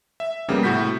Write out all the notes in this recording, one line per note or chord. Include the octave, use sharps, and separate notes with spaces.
E5
F2 C#3 G3 A#3 B3
A2 C3 F#4 G6 B6